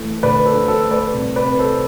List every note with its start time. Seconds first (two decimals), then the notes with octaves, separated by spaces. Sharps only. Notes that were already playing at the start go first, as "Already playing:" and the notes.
Already playing: E3 A3
0.23 D2 B4 D5
0.45 A4 C5
0.53 D3
0.68 A4 C5
0.83 A3
0.91 B4 D5
1.14 C2
1.36 B4 D5
1.44 C3
1.59 A4 C5